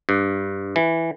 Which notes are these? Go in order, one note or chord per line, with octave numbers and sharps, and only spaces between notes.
G2
E3